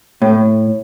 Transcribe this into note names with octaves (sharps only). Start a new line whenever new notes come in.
A2